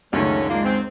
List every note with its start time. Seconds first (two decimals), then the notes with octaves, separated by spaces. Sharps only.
0.13 C#2 F#2 D3 D#3 A3 C#4
0.49 G#3 A#3 D4 F4
0.64 G#2 C4